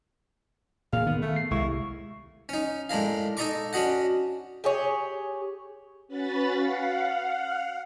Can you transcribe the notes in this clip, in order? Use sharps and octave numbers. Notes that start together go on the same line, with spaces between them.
D2 A#2 G#4 F5
D#3 B3
A3
C7
C2 C3 G#3 E4 C#6
C#4 D#4
A2 G#3 D4 A#4 F5
D#4 A4 D#5 A#5 C#6 D6
C#4 D4 F#4 D#5 F#5
G4 G#4 C#5
C#4 F#4 B4 B5 A6
F5 F#5